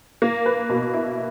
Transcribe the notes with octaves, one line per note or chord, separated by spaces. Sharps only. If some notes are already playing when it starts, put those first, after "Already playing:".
A#3
B4
B2
E4